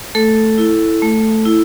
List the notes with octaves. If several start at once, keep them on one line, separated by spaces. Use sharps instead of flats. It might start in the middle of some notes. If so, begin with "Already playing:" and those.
A3 A4
E4
A3
E4